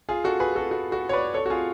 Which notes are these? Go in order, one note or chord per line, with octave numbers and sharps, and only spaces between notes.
F4 G#4
F#4 A4
G#4 B4
F#4 A4
F#4
F#4
C#5
B4 D5
A4 C#5
F#4
F4 G#4